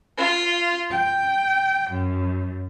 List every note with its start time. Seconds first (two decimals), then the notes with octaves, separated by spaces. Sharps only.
0.18 F4
0.91 G5
1.91 F#2